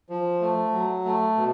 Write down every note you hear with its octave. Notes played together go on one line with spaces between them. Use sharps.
F3
A3
F#3
A3
B2